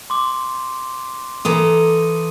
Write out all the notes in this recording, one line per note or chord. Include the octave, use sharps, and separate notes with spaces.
C6 D6
E3 A4 A#5 D#6 D#7